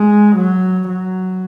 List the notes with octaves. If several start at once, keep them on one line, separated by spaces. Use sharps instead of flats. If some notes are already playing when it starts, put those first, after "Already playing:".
Already playing: G#3
F#3
F#3